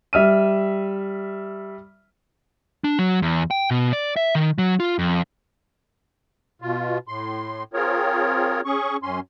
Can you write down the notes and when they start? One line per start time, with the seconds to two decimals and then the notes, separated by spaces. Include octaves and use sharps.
0.13 G3 E5 F6 D#7
2.84 D4
2.99 F#3
3.22 E2
3.51 G5
3.71 B2
3.93 D5
4.16 E5
4.35 D#3
4.58 F#3
4.80 F4
4.99 F2
6.62 B2 F4
7.08 A2 C6
7.74 C4 F4 G#4 A#4 C#5
8.65 C#4 G#4 C#6
9.03 F#2 C#4 C6